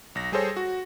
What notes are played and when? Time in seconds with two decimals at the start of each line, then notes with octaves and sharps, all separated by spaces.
0.15 B1 A#6
0.32 G3 G#4 A4 C5 C#5
0.57 F#4